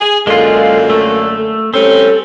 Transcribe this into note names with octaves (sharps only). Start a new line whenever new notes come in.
G#4
F#2 D3 G#3 A#3 F4 A4
A3
G3 C4 C#4 A4